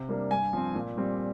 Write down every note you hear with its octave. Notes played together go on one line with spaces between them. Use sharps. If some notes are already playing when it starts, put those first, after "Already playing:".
Already playing: C3
G3 A#3 D4
G2 G#5
F3 C4
A#2
G3 C4